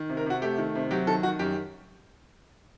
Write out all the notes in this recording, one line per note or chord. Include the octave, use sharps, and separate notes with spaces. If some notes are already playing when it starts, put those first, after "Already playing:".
Already playing: D#3
C3
A#4
C3 F#4
A3 G4
D#3
C3
F#3 G4
D#3 A4
D#3 F#4
F#2 G4